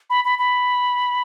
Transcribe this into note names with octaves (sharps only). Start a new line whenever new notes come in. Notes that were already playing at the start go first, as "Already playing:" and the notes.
B5
B5
B5